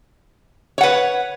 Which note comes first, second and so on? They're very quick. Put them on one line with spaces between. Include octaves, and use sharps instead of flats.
C#5 F#5 B4